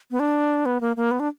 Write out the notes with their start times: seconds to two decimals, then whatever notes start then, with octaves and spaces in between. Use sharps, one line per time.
0.11 B3
0.20 D4
0.66 B3
0.81 A#3
0.96 A#3
1.11 B3
1.20 D4